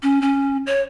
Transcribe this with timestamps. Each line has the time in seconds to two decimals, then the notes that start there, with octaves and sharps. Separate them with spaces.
0.03 C#4
0.22 C#4
0.67 C#5